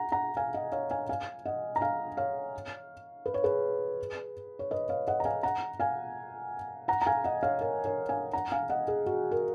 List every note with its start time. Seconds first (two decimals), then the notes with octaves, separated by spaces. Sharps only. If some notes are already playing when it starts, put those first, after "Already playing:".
Already playing: F#5 A#5
0.12 F#5 A#5
0.37 F5 G#5
0.54 D#5 F#5
0.72 C#5 F5
0.90 F5 G#5
1.09 F5 G#5
1.46 D#5 F#5
1.76 A#5
1.81 F5 G#5
2.17 C#5 F5
3.26 B4
3.34 C#5
3.44 G#4 B4
4.59 C#5
4.71 B4 D#5
4.89 C#5 F5
5.08 D#5 F#5
5.20 A#5
5.25 F5 G#5
5.43 F#5 A#5
5.80 F5 G#5
6.88 F#5 A#5
7.02 A#5
7.07 F5 G#5
7.24 D#5 F#5
7.43 C#5 F5
7.61 A#4 C#5
7.85 A#4 C#5
8.09 F5 G#5
8.33 F#5 A#5
8.52 F5 G#5
8.70 D#5 F#5
8.88 G#4
9.06 F#4
9.31 A#4